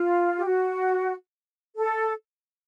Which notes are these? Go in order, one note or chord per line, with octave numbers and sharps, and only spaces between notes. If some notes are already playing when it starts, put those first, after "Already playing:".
Already playing: F4
G4
F#4
A4